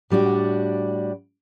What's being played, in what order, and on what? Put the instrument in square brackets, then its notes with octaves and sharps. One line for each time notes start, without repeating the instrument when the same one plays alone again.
[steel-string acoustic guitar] A2 G3 D4 F#4